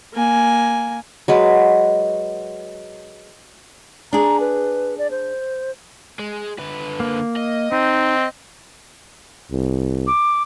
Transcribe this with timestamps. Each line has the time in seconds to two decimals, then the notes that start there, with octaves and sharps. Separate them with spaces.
0.14 A#3 G#5
1.28 F#3 G#3 B4
4.13 D4 G#4 A#5
4.40 B4
4.98 D5
5.11 C5
6.19 G#3
6.59 D3 B4
7.00 A#3
7.36 D#5
7.72 C4 D#4
9.51 C2
10.07 D6